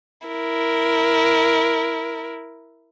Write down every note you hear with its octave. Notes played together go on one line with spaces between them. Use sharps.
E4 A#4